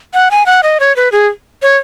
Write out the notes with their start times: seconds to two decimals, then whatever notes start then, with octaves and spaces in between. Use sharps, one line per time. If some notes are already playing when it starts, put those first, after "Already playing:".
0.14 F#5
0.31 G#5
0.46 F#5
0.63 D#5
0.80 C#5
0.96 B4
1.12 G#4
1.62 C#5